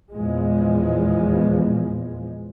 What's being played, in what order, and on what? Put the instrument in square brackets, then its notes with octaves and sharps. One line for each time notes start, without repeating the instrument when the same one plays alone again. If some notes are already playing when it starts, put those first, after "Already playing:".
[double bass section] E2 A#2 F3 G#3